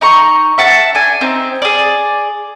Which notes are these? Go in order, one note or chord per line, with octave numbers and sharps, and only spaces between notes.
D#4 A#5 C#6
E5 F#5 A5
D4 G#5
C4 D#4
G#4 D5